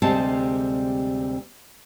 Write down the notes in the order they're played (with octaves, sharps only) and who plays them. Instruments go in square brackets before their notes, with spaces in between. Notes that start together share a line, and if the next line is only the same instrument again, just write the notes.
[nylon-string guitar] D2 C3 G3 G#3 C4 A5